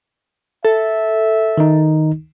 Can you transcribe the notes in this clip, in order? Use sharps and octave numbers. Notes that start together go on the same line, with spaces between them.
A4 E5
D#3 D#4